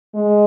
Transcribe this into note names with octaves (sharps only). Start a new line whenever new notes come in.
G#3